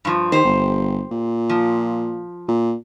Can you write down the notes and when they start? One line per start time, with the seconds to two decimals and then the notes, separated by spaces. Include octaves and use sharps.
0.05 G2 F3
0.32 D#3 G4 C5
0.45 G1
1.11 A#2
1.49 F3
2.48 A#2